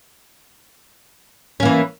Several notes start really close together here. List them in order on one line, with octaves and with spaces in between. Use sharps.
C#4 A#3 E3